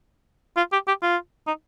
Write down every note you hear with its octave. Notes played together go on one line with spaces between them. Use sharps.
F4
G4
G4
F4
D#4